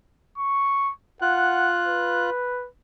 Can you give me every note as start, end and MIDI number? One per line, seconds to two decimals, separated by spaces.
0.38 0.92 85
1.22 2.30 65
1.22 1.70 78
1.22 2.30 90
1.87 2.68 71